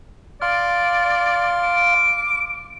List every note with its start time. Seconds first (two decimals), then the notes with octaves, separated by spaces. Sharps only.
0.42 D5 F5 C6 F6
1.63 D6